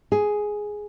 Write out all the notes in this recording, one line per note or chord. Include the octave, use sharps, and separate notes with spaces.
G#4